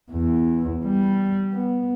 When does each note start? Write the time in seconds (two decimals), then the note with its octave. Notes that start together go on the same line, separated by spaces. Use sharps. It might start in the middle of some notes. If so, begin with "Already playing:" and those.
0.11 E2
0.85 G3
1.53 B3